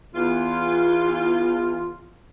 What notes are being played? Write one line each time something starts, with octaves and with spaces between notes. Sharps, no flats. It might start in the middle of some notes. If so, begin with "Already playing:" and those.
E2 F4